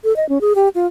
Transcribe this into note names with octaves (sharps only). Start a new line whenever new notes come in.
A4
D#5
C#4
G#4
G4
F4